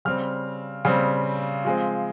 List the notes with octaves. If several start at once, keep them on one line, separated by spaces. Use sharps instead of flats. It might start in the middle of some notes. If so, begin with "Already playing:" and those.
C#3 G3 C4 F6
C#3 G3 C4
F3 G#3 C4